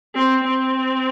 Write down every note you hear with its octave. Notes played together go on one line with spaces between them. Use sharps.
C4
C4